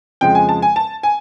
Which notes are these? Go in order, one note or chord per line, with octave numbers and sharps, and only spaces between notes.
F2 C#3 F3 G#3 G5
G#5
A5
G#5
A5
G#5